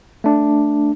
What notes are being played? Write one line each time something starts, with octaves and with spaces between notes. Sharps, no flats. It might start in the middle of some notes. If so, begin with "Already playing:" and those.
A3 D4